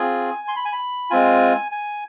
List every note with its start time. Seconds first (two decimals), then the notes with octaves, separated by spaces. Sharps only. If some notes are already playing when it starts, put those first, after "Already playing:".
Already playing: C4 F4 G#4 G#5
0.48 C6
0.56 B5
0.65 G#5
0.73 B5
1.10 G#3 C4 F4 G#5
1.72 G#5